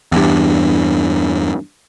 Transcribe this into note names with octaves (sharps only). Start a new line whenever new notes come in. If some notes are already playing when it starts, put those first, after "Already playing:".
E2 G2